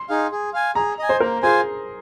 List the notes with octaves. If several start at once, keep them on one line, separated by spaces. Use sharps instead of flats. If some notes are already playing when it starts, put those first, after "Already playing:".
Already playing: C6
D#4 G#4 F5
G#4
F5 G#5
G#4 A#5
D#5 G#5
C5
A#3 A#4
F4 G#4 C5 G#5